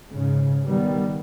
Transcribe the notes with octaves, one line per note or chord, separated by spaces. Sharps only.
G#2 C#3
D#3 G3 B3